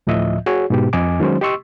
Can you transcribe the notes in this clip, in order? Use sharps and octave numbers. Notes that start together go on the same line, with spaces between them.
D2 A2 F3 D#5 E5
F#4 G#4 C#5
G#2 B2 G4
F2 D#5 G#5 D6
D#3 F#3 G#3 C#4 C5
G4 D#5 C6 C#6 E6